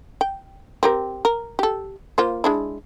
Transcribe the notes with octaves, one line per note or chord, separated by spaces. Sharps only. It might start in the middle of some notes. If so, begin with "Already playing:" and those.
G5
C4 G4 A#4
A#4
G4 A4
A#3 F4 C5
G#3 D4 E4